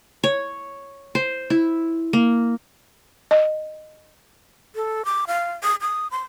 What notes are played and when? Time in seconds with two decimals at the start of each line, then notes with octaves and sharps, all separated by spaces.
0.24 C#5
1.15 C5
1.50 E4
2.13 A#3
3.31 D#5
4.76 A4
5.05 D6
5.27 F5
5.63 D#6
5.81 D#6
6.11 C6